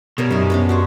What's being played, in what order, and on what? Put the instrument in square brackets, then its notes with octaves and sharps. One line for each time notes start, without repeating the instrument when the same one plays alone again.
[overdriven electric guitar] B2 [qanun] G3 A#4 C#5
[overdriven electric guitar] F#2 [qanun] C3 D#4
[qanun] B3 C#4 D4
F#4 G4 C5